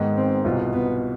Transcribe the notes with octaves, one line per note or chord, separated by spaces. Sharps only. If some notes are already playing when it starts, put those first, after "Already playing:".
Already playing: G#2 D#3 G#3 B3
C4
C2 B2 B3 F4
B3